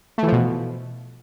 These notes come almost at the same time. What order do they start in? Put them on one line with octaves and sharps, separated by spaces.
A3 E3 F3 B2